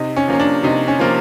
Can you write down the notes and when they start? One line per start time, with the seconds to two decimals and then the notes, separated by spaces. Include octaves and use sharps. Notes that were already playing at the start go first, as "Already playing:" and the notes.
Already playing: C3 D#4
0.16 C#4
0.28 F3 A#3 C#4
0.40 D4
0.63 C3 D#4
0.88 C#4
0.99 F3 A#3